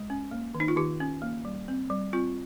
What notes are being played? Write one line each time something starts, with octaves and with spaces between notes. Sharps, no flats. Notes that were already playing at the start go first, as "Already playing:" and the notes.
Already playing: G#3
C#4
A#3
D#3
D#4
F4
D#3 G4
C#4
A#3
G3
C4
G3
C4 F4